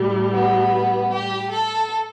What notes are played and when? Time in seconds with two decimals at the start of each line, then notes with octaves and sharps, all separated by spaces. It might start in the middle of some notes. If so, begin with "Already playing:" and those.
Already playing: A2 G3
0.31 B3
1.11 G4
1.50 A4